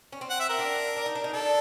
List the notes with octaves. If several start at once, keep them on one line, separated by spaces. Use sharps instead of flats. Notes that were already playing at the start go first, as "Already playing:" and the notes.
C#4
C4
F#5
E5
A#4
D4
D4
D#4
D4
D#4
D4 A4